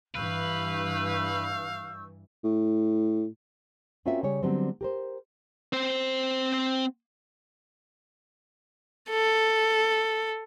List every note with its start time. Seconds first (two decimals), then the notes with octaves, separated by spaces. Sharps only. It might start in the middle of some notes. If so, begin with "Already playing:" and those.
0.15 G2 E3 B4 F5 C#6 E6 G6
2.44 A2
4.06 C4 C#4 F4 F#4 A#4 E5
4.23 C#3 G3 C#5
4.43 D3 F#3 G3 B3 C4
4.81 G4 A#4 C5
5.73 C4 C5
9.10 A4